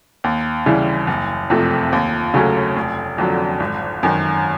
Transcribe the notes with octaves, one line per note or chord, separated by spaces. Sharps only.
D#2
C#3 E3 G3
F#1
F2 C3 F3 A3
D#2
C#3 F#3 A3 C#4
F1
F2 D3 F#3
G#1
F#2 D#3